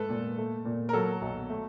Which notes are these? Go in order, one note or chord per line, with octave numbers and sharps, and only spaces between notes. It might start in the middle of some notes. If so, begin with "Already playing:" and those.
Already playing: G#2 A3 A4 B4
A#2
A3
A#2
A#4
F#3 A4
B1
A3